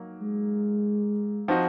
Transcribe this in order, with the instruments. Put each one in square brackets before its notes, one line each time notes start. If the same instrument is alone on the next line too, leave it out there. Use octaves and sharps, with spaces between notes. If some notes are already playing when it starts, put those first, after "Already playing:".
Already playing: [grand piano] F#3 A#3 D#4
[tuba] G#3
[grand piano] F3 C4 D#4 F#4